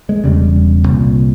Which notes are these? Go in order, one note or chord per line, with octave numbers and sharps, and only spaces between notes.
G#3
E1 E2 C#3 G3
C2 A#2